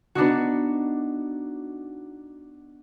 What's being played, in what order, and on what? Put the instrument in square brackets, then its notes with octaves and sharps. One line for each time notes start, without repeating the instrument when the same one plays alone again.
[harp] B3 D4 D#4 F#4